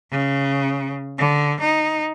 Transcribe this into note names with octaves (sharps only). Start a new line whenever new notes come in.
C#3
D3
D#4